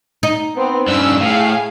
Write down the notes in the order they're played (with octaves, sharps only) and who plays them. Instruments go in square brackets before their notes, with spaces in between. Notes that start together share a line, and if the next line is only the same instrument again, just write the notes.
[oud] D#4
[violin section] B3 C4
[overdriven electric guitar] G2 C#3 [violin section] E6
[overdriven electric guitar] A2 [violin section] G#4 F5